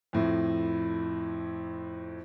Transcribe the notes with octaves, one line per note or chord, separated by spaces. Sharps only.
F2 A2